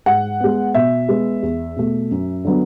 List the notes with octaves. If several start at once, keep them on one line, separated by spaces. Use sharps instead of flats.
G#2 F#5
G#3 B3
B2 E5
G#3 B3
E2
B2 A3
F#2
D3 F#3 B3